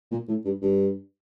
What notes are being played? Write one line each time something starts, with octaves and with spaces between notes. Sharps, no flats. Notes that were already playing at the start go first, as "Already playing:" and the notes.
A#2
A2
G2
G2